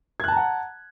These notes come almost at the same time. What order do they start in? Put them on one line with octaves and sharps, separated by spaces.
G#6 F#6 A5 A#5 F#5